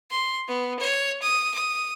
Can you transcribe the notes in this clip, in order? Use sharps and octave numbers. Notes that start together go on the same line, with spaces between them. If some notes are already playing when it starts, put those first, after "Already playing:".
C6
B3
C#5
D#6
D#6